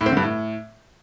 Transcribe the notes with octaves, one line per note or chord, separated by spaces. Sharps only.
A2
C4
D3
G2
A2